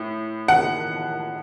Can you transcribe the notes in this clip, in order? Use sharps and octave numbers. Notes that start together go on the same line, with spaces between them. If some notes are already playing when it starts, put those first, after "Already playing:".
Already playing: A2
F#5